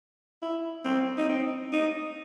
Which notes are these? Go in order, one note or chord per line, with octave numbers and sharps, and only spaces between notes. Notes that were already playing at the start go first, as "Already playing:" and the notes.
E4
C4
D#4
C4
D#4